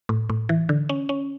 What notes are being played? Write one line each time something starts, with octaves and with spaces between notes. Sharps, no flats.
A2
A2
E3
D3
C#4
C#4